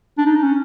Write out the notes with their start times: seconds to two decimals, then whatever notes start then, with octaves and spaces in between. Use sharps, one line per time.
0.18 D4
0.26 D#4
0.36 D4
0.43 C#4